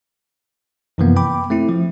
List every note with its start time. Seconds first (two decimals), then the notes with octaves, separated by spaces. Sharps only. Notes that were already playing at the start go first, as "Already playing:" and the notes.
0.98 F#2 C3 E3 F3 A#3 B3
1.16 G5 B5 D6
1.50 A3 C4 E4
1.69 F3